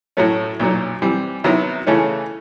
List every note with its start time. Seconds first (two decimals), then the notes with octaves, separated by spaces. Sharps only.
0.17 A2 F#3 A3 C#4
0.59 B1 A#2 F#3
1.02 E3 G3 C4
1.44 C3 D#3 F#3 B3 E4
1.87 C#3 E3 A3 C#4